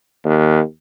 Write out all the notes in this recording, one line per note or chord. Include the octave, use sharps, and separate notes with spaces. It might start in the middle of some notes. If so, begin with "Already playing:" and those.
D#2